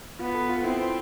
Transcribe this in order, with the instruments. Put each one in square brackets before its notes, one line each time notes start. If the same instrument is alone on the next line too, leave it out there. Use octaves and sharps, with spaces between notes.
[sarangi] B3 [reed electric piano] F4
[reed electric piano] A4
F4
[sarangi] C4 [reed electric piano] E4